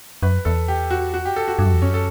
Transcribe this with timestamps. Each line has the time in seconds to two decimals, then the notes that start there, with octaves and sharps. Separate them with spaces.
0.23 F#2 B4
0.45 E2 A4
0.68 G4
0.91 F#4
1.14 F#4
1.25 G4
1.36 A4
1.48 F#4
1.58 G2 F#4
1.66 F#2
1.73 E2
1.81 F#2 C#4
1.94 A4